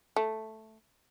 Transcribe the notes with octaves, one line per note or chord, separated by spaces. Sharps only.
A3